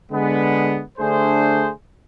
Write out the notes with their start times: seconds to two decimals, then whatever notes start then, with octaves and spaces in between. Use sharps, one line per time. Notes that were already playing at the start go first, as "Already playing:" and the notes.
0.11 D3 G#3 B3
0.98 D3 A3 D4 G#4 C5